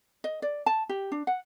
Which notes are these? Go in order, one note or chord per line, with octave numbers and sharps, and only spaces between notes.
D#5
D5
A5
G4
D4
F#5